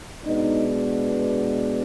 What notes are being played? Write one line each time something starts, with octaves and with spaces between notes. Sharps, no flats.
B2 G#3 B3 D4 D#4